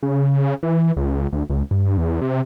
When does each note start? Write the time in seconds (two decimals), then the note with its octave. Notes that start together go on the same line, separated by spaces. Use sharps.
0.03 C#3
0.63 E3
0.97 C#2
1.33 D2
1.50 C#2
1.71 G2
1.98 E2
2.21 C3